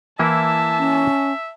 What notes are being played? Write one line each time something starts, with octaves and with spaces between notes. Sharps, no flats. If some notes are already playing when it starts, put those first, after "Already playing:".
E3 A#3 E4 E5 A5
C#4